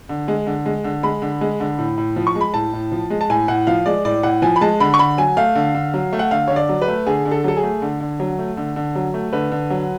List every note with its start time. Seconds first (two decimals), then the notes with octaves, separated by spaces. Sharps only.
0.09 D3
0.28 G#3
0.47 D3
0.66 G#3
0.84 D3
1.03 G#3 B5
1.22 D3
1.41 G#3
1.60 D3
1.78 A2
1.98 A2
2.16 F3
2.27 C#6
2.35 G#3
2.41 B5
2.54 A2 A5
2.73 A2
2.92 F3
3.10 G#3
3.21 A5
3.30 A2 G#5
3.48 A2 F#5
3.67 F3 F5
3.86 G#3 D5
4.05 A2 D5
4.23 A2 F#5
4.42 F3 G#5
4.56 B5
4.61 G#3 A5
4.80 D3 B5
4.94 C#6
4.99 D3 B5
5.18 F#3 G#5
5.37 A3 F5
5.55 D3
5.74 D3
5.94 F#3
6.13 A3
6.19 F#5
6.31 D3 F5
6.48 D3 C#5
6.56 D5
6.69 F#3
6.82 B4
6.88 A3
7.06 D3 G#4
7.25 D3
7.31 A4
7.44 F#3 A4
7.57 G#4
7.63 A3
7.82 D3
8.00 D3
8.20 F#3
8.39 A3
8.57 D3
8.76 D3
8.95 F#3
9.14 A3
9.33 D3 B4
9.52 D3
9.70 F#3